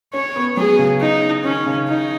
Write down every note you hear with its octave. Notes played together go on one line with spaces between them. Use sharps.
C#4 C#5
B3
F#3 G#4
C#3
D#4
D#3 C#4
C#3
D#4